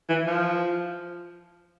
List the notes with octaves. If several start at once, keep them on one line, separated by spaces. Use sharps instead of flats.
E3
F3